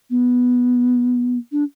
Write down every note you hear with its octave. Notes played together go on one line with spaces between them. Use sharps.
B3
D4